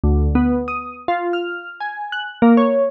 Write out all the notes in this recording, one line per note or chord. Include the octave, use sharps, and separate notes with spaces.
D2
B3
D#6
F4
F6
G#5
F#6
A#3
C#5